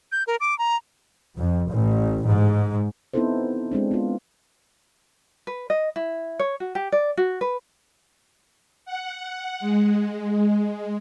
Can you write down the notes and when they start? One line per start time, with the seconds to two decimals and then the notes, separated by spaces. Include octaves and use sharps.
0.12 G6
0.27 A#4
0.40 D6
0.59 A#5
1.36 F2
1.70 A1
2.27 G#2
3.14 B3 C4 D#4 E4 A4 C5
3.72 G#3 C4 D4
3.91 B3 F4
5.47 B4
5.70 D#5
5.96 E4
6.39 C#5
6.60 F#4
6.75 G4
6.92 D5
7.17 F#4
7.41 B4
8.85 F#5
9.60 G#3